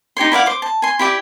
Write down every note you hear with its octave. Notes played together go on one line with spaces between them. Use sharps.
D#4 G4 C#5 C6
E4 D5 F5 F#5
C5 D6
A5
G#5 C6
E4 G4 D5 E5